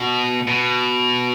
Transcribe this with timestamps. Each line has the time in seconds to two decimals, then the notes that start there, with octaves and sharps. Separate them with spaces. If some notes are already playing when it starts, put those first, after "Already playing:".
Already playing: B2
0.47 B2